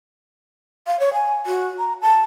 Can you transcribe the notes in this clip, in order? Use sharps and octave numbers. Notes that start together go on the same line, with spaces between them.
F5
C#5
G#5
F#4
A#5
A5